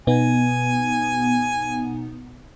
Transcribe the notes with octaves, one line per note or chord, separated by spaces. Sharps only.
B2 B3 D#4 G#5